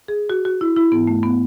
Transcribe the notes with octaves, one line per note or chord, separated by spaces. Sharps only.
G#4
F#4
F#4
E4
E4
G#2 E3 B3
A3
B3